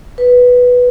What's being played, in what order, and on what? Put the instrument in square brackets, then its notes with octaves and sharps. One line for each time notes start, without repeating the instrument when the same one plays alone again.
[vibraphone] B4